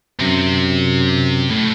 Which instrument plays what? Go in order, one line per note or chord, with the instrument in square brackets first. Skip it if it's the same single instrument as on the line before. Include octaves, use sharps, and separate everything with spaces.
[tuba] F#2 [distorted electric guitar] C3
[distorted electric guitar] A2